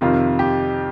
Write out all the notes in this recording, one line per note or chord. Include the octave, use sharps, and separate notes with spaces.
F2 C3 D#3 F4
G4